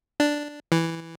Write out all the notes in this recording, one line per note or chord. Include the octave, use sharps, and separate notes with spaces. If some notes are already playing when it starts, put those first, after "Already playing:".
D4
E3